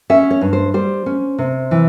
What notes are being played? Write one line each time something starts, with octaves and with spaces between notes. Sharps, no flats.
C#4 E5
C#5
G2
C5
G3 C5
C#4
C3
E3